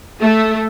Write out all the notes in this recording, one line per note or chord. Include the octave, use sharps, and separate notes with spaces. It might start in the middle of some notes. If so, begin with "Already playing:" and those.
A3